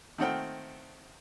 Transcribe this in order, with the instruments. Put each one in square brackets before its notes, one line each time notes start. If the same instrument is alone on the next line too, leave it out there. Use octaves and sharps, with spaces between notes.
[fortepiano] D#3 A3 C4 F#5 G5 F6